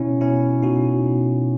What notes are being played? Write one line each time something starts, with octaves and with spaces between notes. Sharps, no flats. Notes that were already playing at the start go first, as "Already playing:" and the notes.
Already playing: B2 C#4 E4
B2 C#4 E4
B2 D#4 F#4
B2